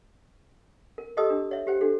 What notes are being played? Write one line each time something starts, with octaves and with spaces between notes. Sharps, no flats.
A#4
G4 A4 D#5 A5 D#6 E6
D4
C#5 E5
G4 C5 G5
D4 F#4 A4